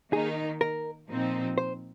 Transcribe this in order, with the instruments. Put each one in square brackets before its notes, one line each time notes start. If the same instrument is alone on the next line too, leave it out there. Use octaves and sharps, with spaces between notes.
[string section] D#3 A#3 D#4 [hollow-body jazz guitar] G#4
[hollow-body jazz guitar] A#4
[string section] A#2 F3 C4 D#4
[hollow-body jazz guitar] C5